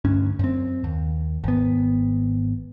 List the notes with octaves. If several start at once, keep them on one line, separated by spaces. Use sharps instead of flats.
D2 G2 C#4
F#2 C4
D#2
G#1 B3